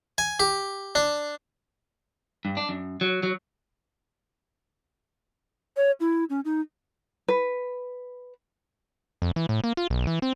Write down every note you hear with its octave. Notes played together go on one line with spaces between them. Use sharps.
G#5
G4
D4
G2
D4
F#2
F#3
F#3
C#5
E4
C#4
D#4
B4
F2
E3
A2
A#3
F4
B1
E3
C4